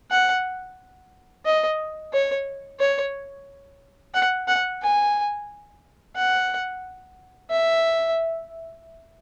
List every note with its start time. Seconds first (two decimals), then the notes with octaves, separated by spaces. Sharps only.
0.11 F#5
1.46 D#5
2.13 C#5
2.80 C#5
4.14 F#5
4.48 F#5
4.83 G#5
6.16 F#5
7.51 E5